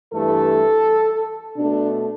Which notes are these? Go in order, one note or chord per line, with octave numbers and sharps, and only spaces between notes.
G2 E3 A3 A4
B2 A3 D4